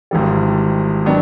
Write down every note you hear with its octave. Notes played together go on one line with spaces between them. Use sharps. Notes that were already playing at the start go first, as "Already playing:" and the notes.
G#1 G#2 E3 G3
D#3 F#3 B3 D4